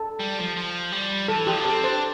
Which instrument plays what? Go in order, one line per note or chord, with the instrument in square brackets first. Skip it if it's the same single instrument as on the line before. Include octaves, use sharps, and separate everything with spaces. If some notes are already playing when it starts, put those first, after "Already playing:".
Already playing: [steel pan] A4
[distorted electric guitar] G3
F3
F3
G3
[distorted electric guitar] E3 [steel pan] A4
[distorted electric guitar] F3 [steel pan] G4
[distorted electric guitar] D4
[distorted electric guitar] C4 [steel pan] A4
[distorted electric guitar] D4 [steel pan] C5